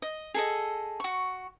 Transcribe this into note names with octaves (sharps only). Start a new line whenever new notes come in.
D#5
G#4 A4 D#5
F#4 C#6